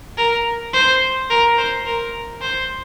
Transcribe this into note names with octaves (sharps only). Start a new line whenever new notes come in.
A#4
C5
A#4
C5
A#4
C5